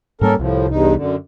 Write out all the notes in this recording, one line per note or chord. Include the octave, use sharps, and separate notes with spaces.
G#2 G3 A#3 C#4 A4 A#4
C2 A2 F3
E2 G2 D#4
F#2 D3